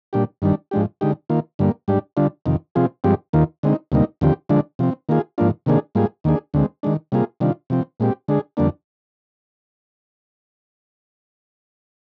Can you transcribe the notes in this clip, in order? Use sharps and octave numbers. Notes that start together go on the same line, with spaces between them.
A#2 G3 D4 G4
G2 D#3 G3 D4
G#2 F3 G#3 D4 G4
D3 G#3 D#4 G4
D#3 A#3 F4
G2 D3 G3 A#3
G#2 G3 D4 G4
D3 G3 D4 F4
F2 C3 D#3
C3 F3 C4 F4 G#4
G2 F3 G#3 C4 G4
D#2 D#3 A#3 F4
D3 G#3 C4 D#4
D2 C3 G3 A#3 D#4
D#2 D3 F3 C4 G4
D3 F3 G#3 D4
C3 F3 C4
D#3 A#3 F4 G#4
G#2 F3 A#3 D4 F4
C3 D#3 A#3 D4 G#4
G#2 G3 A#3 F4 G#4
D#2 D#3 A#3 D4 G#4
D2 D3 G#3 C4
D#3 G#3 D4
C3 G3 A#3 F4 G#4
C3 D#3 G3 D4 F4
C3 F3 C4
A#2 G#3 C4 G4
D3 G#3 D4 G#4
F2 D3 G3 A#3 D4